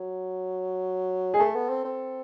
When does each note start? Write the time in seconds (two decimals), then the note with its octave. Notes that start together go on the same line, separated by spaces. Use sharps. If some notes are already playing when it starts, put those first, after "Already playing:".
Already playing: F#3
1.34 G#3 G#4
1.40 A3 A4
1.55 B3
1.69 C4
1.85 C4